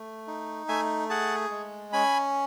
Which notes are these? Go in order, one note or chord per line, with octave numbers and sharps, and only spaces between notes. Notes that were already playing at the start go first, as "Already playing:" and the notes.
Already playing: A3
D#4
A3 E5 G#5
G#4 F#5 A5
G#3
C#4 G#5 B5